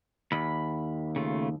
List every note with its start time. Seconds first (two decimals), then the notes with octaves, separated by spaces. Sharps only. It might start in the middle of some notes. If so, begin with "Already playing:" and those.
0.32 D#2 B5
1.16 C#3 A3 F4